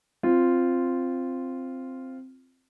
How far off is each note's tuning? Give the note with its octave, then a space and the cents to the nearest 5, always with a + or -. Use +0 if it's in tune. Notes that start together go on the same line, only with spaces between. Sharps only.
C4 +0 F4 -5